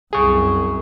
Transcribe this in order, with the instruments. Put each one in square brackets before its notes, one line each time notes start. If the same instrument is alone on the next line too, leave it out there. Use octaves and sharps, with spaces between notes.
[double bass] C2 F#2 [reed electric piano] G#4 C#6